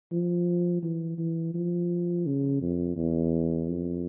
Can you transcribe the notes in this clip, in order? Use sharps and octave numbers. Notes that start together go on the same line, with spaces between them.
F3
E3
E3
F3
C#3
F2
E2
F2